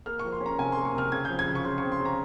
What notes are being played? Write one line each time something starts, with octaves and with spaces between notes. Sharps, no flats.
A#3 F6
F3 C#6
C6
C#4
A#5
C3 G#5
C6
A#3
C#6
C3 F6
C#3 G#6
F3 G6
G#6
C#3
C#6
C#3 C6
C4 C#6
C6
C#3
A#5